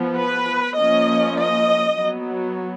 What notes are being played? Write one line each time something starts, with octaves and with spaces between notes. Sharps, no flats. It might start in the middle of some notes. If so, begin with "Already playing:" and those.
Already playing: F3 B3
B4
F3 A#3 C#4 D#5
D#5
F#3 B3